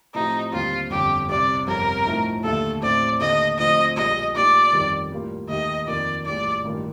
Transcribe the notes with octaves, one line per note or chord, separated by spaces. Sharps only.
A2 F3 A3 C4 D#4 G4
D#2 D3 G3 C4 F4 G4
G1 F2 D3 G4
C2 C3 G3 D5
G1 F2 C3 A#4
A2 F3 A3 D#4
D#2 D3 A3 A4
A1 A2 A3 C4 D5
D#2 D3 A3 D#5
D2 D3 F3 C4 D#5
A#1 A#2 G3 D#5
A#2 A3 D#4 G4 D5
G1 F2 D#3 G3
A2 G3 A#3 F4
D#2 D#3 A3 D#4 G4 D#5
F2 D#3 A#3 F4 D5
A#1 A2 G3 D5
A1 G2 D#3 A#3 F4